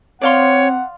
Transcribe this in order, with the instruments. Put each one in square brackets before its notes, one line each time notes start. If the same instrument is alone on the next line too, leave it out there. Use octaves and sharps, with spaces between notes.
[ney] C4 [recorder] C#5 [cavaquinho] D5 F5 C6 [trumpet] F#5